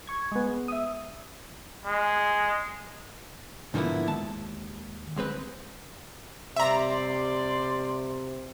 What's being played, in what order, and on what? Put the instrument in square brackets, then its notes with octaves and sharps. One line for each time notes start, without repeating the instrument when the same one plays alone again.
[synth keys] C#6 G#6
G#3 B3
E5 D#6
[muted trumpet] G#3
[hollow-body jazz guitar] G#2 D3 F3 A#3 B3 E4
D#2 G#3 A5
D2 G#3 C4 B4
[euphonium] C3 [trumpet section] G3 D5 C6 [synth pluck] E5 A#5